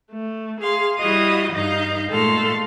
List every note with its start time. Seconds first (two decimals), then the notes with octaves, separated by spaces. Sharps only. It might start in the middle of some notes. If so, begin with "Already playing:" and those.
0.12 A3
0.62 G#4 F5 C6
0.97 G3 E4 F#4 D#5 F5 D#6
1.52 G2 D#4 D#5 F5 G6
2.11 A#2 G#3 A3 A4 F5 C6